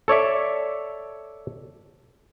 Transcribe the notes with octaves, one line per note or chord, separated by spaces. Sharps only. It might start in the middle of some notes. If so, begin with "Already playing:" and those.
A4 C#5 D5 E5